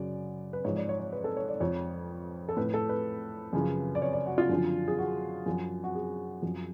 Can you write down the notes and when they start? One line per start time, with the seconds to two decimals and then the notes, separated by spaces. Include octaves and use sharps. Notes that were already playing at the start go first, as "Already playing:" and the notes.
Already playing: F#2 C#3 F#3 D5
0.53 B4
0.64 G#2 F3 C#5
0.76 D5
0.89 C#5
1.00 C#5
1.12 B4
1.24 A4
1.37 C#5
1.48 D5
1.60 F2 F3 C#5
2.49 A4
2.57 A2 F3 B4
2.74 A4
2.89 B4
3.53 F#2 C#3 F3
3.95 D5
4.02 C#5
4.13 D5
4.26 F#4
4.38 F4
4.49 F#2 D3 F3
4.88 G#4
4.98 F#4
5.46 F#2 F3
5.84 F#4
5.95 G#4
6.42 F#2 F3